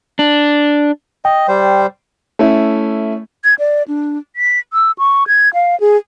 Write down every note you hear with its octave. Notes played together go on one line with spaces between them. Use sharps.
D4
D#5 G5
G3 C5
A3 C#4 E4
G#6
D5
D4
B6
E6
C#6
G#6
F5
G#4